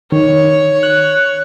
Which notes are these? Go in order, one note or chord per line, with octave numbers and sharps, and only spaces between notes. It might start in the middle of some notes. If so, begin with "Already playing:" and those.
D#3 C#5
F#6